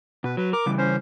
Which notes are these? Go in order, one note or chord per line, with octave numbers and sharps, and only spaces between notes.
B2 B4
F#3 B4
A#4 D6
C#3 E3 G3
C#4 C5